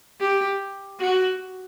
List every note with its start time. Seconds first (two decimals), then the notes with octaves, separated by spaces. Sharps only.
0.20 G4
1.00 F#4